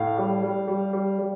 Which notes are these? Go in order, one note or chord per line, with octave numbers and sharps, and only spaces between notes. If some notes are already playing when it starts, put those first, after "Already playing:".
Already playing: A2 F5
G3
G3
G3
G3
G3